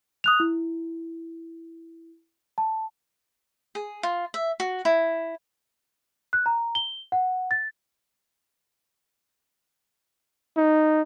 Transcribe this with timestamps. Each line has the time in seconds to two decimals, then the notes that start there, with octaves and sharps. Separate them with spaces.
0.24 D#6 F#6 F7
0.40 E4
2.58 A5
3.75 G#4
4.03 F4
4.34 E5
4.60 F#4
4.85 E4
6.33 F#6
6.46 A#5
6.75 G7
7.12 F#5
7.51 A6
10.57 D#4